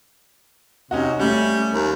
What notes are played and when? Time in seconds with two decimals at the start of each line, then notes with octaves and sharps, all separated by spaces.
0.91 C3 C#4 D#4 F#4
1.19 G3 A3 C#4
1.73 D#2